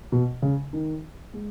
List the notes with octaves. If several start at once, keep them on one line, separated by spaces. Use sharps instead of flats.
B2
C#3
D#3
G#3